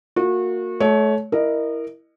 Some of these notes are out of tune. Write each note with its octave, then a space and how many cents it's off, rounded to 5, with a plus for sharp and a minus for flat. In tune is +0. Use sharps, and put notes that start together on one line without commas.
A#3 -25 F#4 -30
A3 -30 C#5 +15
E4 +0 A#4 +0 D#5 -30